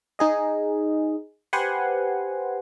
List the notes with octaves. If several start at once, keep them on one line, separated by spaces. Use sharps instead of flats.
D#4 G#4 D#5
G4 B4 C5 F#5 G#5 C6